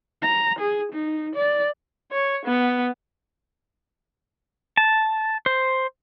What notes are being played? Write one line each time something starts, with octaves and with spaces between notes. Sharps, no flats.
A#5
G#4
D#4
D5
C#5
B3
A5
C5